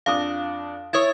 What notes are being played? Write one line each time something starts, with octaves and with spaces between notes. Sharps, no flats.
F2 D4 F5 D#6
E4 C#5 D#6 G#6 A6